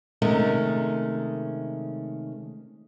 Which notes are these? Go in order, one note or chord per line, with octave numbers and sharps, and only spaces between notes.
C3 D#3 G#3 A3 C#4